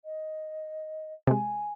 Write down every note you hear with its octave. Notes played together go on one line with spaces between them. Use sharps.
D#5
C3 G#3 G#5